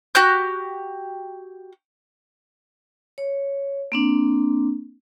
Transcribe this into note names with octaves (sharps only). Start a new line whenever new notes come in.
F#4 G4 F#6 G6
C#5
A#3 C4 D4